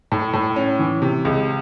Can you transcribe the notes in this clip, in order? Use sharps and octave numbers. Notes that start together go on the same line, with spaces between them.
A2
A2
C#4
E3
C3
C#2